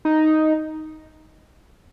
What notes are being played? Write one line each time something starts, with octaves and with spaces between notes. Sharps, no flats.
D#4